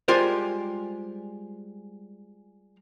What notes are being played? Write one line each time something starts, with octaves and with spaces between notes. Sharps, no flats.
G3 G#3 F4 G4 A#4 C5